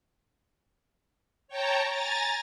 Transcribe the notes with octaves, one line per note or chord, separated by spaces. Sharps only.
C#5 G5 A5 A#5
G#5 A#5 A6